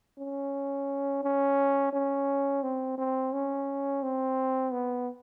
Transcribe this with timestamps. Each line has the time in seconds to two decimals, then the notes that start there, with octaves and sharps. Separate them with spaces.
0.19 C#4
1.24 C#4
1.93 C#4
2.63 C4
2.98 C4
3.33 C#4
4.03 C4
4.72 B3